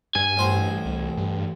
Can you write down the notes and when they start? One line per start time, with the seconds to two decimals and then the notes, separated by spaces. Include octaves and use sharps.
0.15 G2 G#5
0.37 A1 C5
0.86 C2
1.17 G2